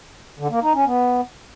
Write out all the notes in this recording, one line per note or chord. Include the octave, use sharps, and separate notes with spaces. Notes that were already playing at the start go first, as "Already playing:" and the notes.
D3
A#3
D#4
C#4
B3